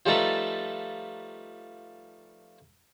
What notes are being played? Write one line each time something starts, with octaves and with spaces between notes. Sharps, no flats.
F3 G3 A3 D#4 A4 B4